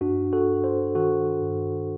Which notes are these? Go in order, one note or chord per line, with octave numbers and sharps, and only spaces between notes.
G2 D4 F#4
F#4 A4
G2
A4 C5
D#3 F#4 A4
G2